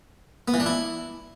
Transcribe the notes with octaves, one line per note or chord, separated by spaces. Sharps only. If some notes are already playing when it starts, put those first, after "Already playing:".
B3
E3
D4
E4